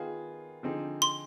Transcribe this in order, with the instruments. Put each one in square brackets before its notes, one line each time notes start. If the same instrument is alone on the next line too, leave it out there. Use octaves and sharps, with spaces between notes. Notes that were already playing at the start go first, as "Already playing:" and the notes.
Already playing: [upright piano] D#3 B3 F4 G#4
D3 F3 C4 D#4 G#4
[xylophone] C6